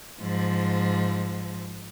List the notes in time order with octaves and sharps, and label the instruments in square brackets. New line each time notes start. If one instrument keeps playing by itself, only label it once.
[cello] G#2 F3